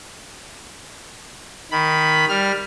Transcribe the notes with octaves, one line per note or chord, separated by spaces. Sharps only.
D#3 B5
G3 F6